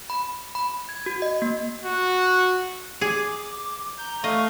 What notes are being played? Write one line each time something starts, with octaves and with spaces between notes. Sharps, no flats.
B5
B5
G#6
F#4
D#5
A#3
F#4
G#4 D6
A#5 G6
A3 D#5 F5 C#6